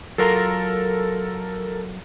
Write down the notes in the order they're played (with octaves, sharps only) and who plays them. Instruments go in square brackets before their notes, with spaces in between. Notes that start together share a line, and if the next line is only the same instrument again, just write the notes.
[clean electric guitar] F#3 F4 A#5 [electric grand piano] A4 A#4